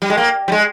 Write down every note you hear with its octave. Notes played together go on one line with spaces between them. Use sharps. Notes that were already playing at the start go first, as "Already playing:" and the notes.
G3
G#3
A#3
G3
G#3